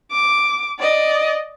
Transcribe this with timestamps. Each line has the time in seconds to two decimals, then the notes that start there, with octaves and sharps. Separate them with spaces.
0.12 D6
0.80 D5 D#5